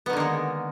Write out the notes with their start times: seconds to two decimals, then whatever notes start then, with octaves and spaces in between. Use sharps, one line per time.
0.06 B3
0.10 D#3
0.13 D3
0.17 A#3
0.20 G#3